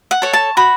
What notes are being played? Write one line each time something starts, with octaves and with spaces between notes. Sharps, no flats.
F#5
A4 C#5
A5
F#4 B5